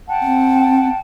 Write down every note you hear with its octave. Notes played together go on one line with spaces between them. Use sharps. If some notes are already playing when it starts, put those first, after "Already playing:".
F#5 G5 A5
C4